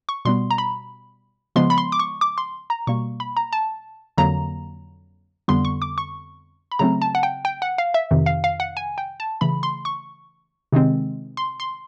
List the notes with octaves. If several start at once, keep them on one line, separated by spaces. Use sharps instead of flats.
C#6
B2 G3 B3 C6
A#5
B5
C#3 F3 G#3 B3 C6
B5
C6
D6
C#6
D6
C6
A#5
B2 G3 A#3 C#6
B5
A#5
A5
F2 D3 F#3 A#3 A#5
F2 D3 G3 B3 C6
C#6
D6
C#6
B5
C#3 F#3 A3 C4 A#5
A5
F#5
G5
G5
F#5
F5
E5
F2 C3 D#3
F5
F5
F#5
G#5
G5
A5
C#3 E3 A3 B5
C6
C#6
C3 D#3 G#3 C4
C6
C6